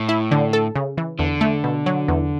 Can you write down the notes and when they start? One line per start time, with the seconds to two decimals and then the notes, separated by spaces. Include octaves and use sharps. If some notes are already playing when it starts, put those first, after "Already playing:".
Already playing: A2
0.09 E4
0.31 D3
0.53 A4
0.76 C#3
0.98 E3
1.19 E2 D3
1.41 A3
1.64 B2
1.86 F#3
2.08 E2